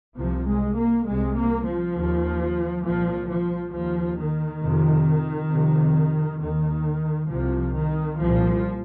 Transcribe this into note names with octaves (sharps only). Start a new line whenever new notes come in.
C2 C3 F3
G#3
A#3
C2 C3 G#3
A#3
F3
D#2
C2 A#2 F3
F3
D#2 F3
D#3
F2 C3
F2 C3
D#2 D#3
C2 C3 F3
D#3
C2 A#2 F3